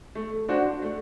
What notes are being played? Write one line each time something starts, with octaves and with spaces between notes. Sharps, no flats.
A3
D4 F#4 C5
A3